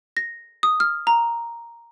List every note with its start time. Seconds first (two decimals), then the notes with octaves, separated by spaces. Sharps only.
0.17 A#6
0.63 D#6
0.80 F6
1.07 A#5